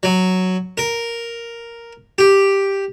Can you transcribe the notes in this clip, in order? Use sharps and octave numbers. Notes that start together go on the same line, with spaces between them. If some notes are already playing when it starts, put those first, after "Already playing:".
F#3
A#4
G4